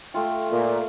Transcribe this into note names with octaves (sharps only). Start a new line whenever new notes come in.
A3 F4 G5
A#2 A#4